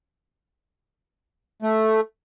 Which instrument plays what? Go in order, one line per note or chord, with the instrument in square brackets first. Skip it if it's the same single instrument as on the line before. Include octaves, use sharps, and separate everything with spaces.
[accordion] A3